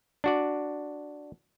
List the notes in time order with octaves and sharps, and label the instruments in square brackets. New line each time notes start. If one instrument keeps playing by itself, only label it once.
[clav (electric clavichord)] D4 F#4 D5